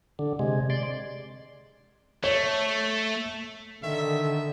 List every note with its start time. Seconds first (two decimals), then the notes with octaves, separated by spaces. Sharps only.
0.19 D3
0.39 C3 G#3
0.70 D5 C6
2.24 A3 C#5
3.83 D3 D#3 E5